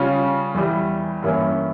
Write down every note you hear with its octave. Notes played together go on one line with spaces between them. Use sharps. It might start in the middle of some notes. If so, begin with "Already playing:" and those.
Already playing: C#3 G3 C#4 F4
E2 E3 G3
G2 E3 A#3 C#4 E4